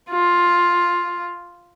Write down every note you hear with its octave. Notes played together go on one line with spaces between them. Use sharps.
F4